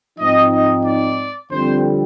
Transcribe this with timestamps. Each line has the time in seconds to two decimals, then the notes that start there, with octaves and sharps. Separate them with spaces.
0.19 G#2 F3 C4 D#4 D#5
0.52 D#5
0.85 D5
1.51 F2 D3 G3 C4 C5